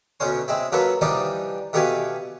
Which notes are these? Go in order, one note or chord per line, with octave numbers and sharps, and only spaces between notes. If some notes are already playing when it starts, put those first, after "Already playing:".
D2 B2 C#4 C5 C6
G#3 C4 E4
F#3 A#3 F4 A4 B4 F#5
E3 F3 G3 D4 D#4 G4
B2 A3 G4 B4 F5 G#5